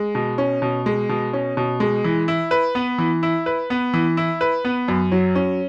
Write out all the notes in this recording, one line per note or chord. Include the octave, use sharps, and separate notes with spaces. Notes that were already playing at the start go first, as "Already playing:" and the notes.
Already playing: G#3
B2
C#4
B2
G#3
B2
C#4
B2
G#3
E3
E4
B4
B3
E3
E4
B4
B3
E3
E4
B4
B3
F#2
F#3
C#4